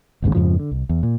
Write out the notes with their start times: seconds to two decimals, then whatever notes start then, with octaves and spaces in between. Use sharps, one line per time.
0.22 A1 D#2 G#2 C#3
0.35 F2 G#2 C#3 F3
0.59 D3
0.71 C2
0.89 E2
1.03 A#2